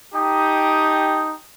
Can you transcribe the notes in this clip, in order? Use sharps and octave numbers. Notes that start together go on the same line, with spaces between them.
D#4 G4 G5 A5 D#6